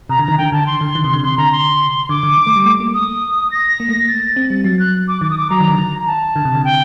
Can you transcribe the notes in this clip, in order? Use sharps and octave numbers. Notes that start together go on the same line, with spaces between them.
C3 A#5
D3
D#3 A#5
D3 G5
D3 A5
C6
D3
D#3
C3
D3
C3 C6
D3 A#5
C6
D3 D6
D3
D3
A3
G3
A3
A#3
D#6
A#6
A#3
A3
A6
C4
G3
F#3 A6
F#6
D6
D#3 D6
D#6
D6
F#3 A#5
D#3
D3
D#3
A#5
A5
D3
C3
D3
G5